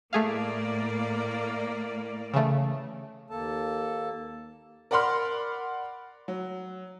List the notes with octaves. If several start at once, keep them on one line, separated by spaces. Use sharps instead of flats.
A2 A3 A#3 G#4 D5 F5
C#3 E3 A3
D#2 A#3 A4 A5
A#4 D5 F#5 B5 C6 F6
F#3